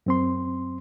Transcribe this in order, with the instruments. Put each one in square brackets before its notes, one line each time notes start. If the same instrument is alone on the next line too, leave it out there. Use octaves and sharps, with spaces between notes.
[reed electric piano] F#2 C4 C6